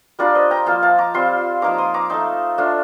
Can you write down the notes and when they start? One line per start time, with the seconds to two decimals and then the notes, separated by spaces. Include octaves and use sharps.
0.19 G3 D4 F4 A#4 D5
0.35 C5 D#5
0.50 G5 A#5
0.66 F3 A#3 F4 F5 A5
0.83 F5 A5
0.98 A#5 D6
1.14 G3 C4 F4 A5 C6
1.62 F3 A#3 D#4 A#5 D6
1.78 C6 D#6
1.94 A#5 D6
2.10 A3 D#4 A5 C6
2.58 A3 D4 F4